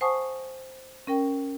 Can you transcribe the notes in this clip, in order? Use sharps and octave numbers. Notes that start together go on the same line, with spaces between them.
C5 F#5 G#5 A5 C#6 D#6
C#4 A#4 G5